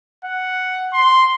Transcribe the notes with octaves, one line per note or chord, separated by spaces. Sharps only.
F#5
C6